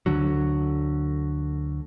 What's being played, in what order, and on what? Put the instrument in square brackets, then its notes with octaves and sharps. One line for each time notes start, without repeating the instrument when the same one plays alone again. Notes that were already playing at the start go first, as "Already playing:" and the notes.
[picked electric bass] D2 D3 F#3